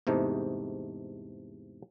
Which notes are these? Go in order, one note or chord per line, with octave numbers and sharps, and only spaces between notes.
E2 G#2 C3 A3 D#4